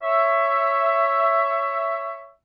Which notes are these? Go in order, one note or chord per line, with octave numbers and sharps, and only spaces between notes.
C#5 E5